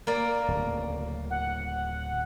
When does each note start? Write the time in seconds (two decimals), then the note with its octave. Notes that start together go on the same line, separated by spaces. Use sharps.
0.07 A#3 A#4 D5
0.48 D1 D2 C#3
1.31 F#5